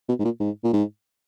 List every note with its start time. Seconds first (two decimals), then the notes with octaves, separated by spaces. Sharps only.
0.09 B2
0.19 G#2
0.25 A#2
0.40 G#2
0.64 A#2
0.73 G#2